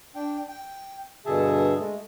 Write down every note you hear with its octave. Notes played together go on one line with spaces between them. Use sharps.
D4 G5
G5
G2 B2 D3 G#4 E5 A5
G#3 A3